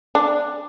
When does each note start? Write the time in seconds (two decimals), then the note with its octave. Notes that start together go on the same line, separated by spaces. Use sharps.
0.15 D4